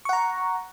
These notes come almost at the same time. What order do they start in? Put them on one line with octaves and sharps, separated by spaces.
C#6 F#5 A#5